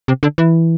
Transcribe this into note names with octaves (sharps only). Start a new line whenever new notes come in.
C3
D3
E3